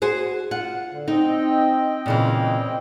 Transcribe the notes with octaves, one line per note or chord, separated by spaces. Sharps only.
F#4 G#4 C5
F4 F#5
D3
C4 D#4 D#5 G5
A#2 C#3 E3